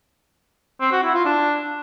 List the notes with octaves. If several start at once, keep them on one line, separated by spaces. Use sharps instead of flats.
C4
F#4
E4
F4
D4